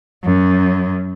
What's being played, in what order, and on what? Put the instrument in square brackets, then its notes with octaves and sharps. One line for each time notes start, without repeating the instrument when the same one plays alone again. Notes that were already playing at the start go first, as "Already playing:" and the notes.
[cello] F#2